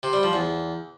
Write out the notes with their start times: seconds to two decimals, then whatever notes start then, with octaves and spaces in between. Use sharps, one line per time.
0.03 C3
0.13 G3
0.23 F3
0.33 E2